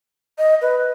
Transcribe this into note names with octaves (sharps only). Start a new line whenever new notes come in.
D#5
B4